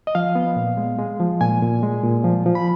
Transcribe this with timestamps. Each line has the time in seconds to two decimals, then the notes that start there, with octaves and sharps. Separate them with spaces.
0.07 D#5
0.15 F3 F5
0.35 B3
0.56 A#2
0.77 G#3
0.98 G#3
1.20 F3
1.41 A#2 G#5
1.62 A#2
1.83 G#3
2.04 A#2
2.24 F3
2.46 F3
2.55 B5